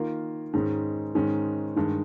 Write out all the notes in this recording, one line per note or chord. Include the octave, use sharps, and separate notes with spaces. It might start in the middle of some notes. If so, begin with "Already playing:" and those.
Already playing: D#3 A#3 F4 A#4
G#2 D#3 G#3 C#4
G#2 D#3 G#3 C#4
G2 D#3 G#3